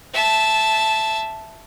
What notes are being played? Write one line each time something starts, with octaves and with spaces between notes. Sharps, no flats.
E5 A5